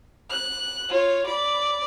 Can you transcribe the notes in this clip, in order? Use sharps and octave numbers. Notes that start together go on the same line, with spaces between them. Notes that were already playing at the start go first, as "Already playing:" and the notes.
F#6
F4 C#5
D5 B5